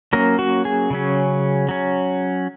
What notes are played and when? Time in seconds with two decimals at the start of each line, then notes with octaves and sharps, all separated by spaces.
0.13 F#3 A#3 C#4 A#4
0.39 F#4
0.65 G#4
0.90 C#3 F#3 C#4
1.69 F#3 C#4